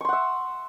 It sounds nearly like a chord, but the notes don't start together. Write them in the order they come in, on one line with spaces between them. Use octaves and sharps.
C#6 C6 F#5 E5